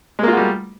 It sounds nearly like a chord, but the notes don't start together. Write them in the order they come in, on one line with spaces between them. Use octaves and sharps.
G#3 A#3 F4 F#4 G3